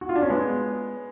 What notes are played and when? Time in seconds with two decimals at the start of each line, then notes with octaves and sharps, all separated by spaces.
0.01 F#4
0.09 F4
0.16 D4
0.22 C#4
0.30 G#3 B3